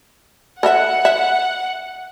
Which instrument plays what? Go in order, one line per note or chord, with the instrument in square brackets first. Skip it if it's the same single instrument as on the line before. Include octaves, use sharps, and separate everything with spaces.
[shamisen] A4 D#5 E5 [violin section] F#5
[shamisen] E5